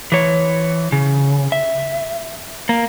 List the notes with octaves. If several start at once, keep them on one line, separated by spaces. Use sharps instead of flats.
E3 C#5
C#3
E5
A#3